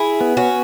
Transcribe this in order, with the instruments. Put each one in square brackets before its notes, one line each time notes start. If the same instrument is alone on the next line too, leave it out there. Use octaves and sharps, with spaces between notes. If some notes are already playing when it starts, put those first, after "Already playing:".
Already playing: [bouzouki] E4 G#4
[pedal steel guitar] B3
[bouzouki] C#4 F#4